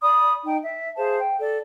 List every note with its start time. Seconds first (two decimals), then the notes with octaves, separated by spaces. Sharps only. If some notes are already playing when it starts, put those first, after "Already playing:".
0.01 D5 B5 D#6
0.44 D#4 G5
0.61 E5
0.97 G#4 C5 F5 A5
1.18 G5
1.40 A4 D5